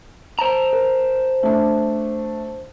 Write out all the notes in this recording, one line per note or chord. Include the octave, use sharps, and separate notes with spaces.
C5 A5 A#5
A#4
A3 D4